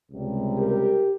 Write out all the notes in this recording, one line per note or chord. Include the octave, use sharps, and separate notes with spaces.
C#2 C3 G3
G4 A#4